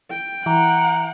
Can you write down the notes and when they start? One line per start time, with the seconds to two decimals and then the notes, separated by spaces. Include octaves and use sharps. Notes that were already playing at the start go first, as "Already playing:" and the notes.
0.10 G5
0.46 E3 F#5 A#5